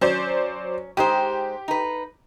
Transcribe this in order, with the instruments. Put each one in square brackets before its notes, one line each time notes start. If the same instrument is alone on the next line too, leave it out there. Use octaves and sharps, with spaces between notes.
[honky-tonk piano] F#3 C5 D5 [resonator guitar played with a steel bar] C#4
[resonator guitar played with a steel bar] G#3 D#4 C5 [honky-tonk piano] G4
[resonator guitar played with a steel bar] D#4 B4